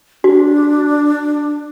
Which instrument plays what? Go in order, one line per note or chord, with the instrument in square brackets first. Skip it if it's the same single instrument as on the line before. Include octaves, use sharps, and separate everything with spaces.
[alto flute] D4 [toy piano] F#4